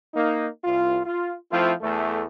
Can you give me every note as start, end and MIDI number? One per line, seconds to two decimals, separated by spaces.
0.14 0.48 58
0.14 0.48 63
0.65 1.01 36
0.65 1.01 65
1.06 1.33 65
1.51 1.72 53
1.51 1.72 57
1.51 1.72 60
1.51 1.72 64
1.51 1.72 65
1.81 2.24 40
1.81 2.24 57